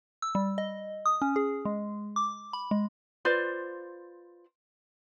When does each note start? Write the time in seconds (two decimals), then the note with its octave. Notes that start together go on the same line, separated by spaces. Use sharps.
0.22 E6
0.35 G3
0.58 D#5
1.06 D#6
1.22 C#4
1.36 G#4
1.65 G#3
2.16 D6
2.53 B5
2.71 G#3
3.25 F4 B4 C5 D5